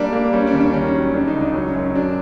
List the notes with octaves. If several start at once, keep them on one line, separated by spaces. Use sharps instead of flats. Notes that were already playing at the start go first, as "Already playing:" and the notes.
Already playing: G3 A#3 D4
A#3
G3 C#4
D4
D#2 C#4
D4
D#3 C#4
F#3
D#3 D4
D#4
C#2
D4
F#3 C#4
F#2
C#4
F#3 D4